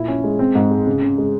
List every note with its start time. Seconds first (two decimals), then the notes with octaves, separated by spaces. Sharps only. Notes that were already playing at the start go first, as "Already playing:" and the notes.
Already playing: A#2 E4
0.08 C#4
0.24 G#3
0.39 C4
0.55 G#2
0.71 G#3
0.87 C#3
1.02 C#3
1.18 G#3